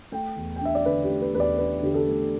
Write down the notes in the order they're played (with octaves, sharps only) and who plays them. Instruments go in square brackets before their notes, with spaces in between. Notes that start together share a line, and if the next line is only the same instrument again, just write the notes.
[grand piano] A3 G5
E2
G5
D4 E5
D5
D3 B4
G4
A3
B4
E2 B4
D5
D4 B4
D3 G4
A4
A3